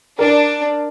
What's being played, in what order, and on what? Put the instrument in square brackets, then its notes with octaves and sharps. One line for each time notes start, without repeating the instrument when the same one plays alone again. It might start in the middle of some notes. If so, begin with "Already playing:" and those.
[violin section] D4 [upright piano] A#4 D5